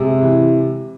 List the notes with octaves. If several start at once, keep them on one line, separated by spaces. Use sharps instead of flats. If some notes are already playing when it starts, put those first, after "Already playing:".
Already playing: C3 G#3
E3